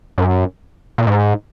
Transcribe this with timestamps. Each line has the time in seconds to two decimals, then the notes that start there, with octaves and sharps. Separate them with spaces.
0.18 F#2
0.98 A#2
1.07 G#2